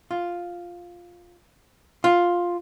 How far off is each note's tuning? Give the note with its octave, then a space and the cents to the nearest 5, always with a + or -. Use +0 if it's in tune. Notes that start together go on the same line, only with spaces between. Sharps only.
F4 +5
F4 +5